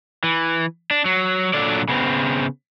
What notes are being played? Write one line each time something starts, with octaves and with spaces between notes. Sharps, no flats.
E3
D4
F#3
A#2 F#3 D4 A4 D5
C#3 B3 C4